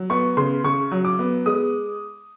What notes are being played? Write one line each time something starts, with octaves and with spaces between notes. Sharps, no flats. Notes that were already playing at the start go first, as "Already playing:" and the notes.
Already playing: F#3
B3 C#6
C#3 C6
C#3 C#6
F#3
D6
B3
G#3 D#6